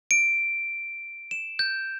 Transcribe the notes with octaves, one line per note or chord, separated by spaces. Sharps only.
D7
E7
G6